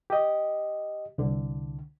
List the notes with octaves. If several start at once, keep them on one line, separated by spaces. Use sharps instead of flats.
G4 D#5
C2 D3